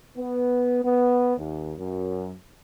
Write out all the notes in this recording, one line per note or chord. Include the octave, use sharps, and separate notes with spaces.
B3
B3
D#2
F#2